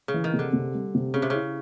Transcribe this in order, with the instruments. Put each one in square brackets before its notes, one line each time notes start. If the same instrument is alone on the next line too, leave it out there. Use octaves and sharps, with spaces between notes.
[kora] C#3
[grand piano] E3
[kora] D#3
[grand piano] C3
[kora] D3
[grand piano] C3
G3
C3
[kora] C#3 [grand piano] C#4
[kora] C3
[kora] C#3 [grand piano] E4